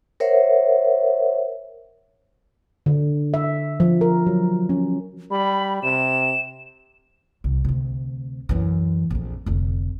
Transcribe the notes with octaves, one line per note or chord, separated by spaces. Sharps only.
A#4 C5 C#5 E5 F#5
D3
E5
F3
A#4
F#3
C#4
G3 B5
C3 E7
C2
D2 C3
F#2 E3
A#1 F2
F1 D2